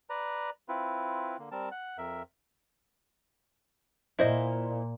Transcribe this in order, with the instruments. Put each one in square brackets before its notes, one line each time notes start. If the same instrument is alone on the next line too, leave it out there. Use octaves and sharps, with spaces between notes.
[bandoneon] B4 D5 A#5
C4 E4 F4 B4
D3 A#3
G3 C4 A#4 A5
F#5 F#6
F2 A#4 E5
[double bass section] A#2 [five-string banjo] E4 C5 D#5